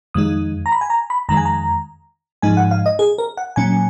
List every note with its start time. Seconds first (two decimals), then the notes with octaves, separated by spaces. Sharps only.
0.14 F2 D#3 G#3 D#4 D#6
0.66 A#5
0.72 B5
0.81 G#5
0.90 A#5
1.10 B5
1.29 F2 D#3 G#3 A#5
1.37 G#5
1.45 A#5
2.42 G#2 F3 G#3 D#4 G#5
2.57 F#5
2.71 F5
2.86 D#5
2.99 G#4
3.18 A#4
3.37 F#5
3.56 A#2 F#3 C#4 G#5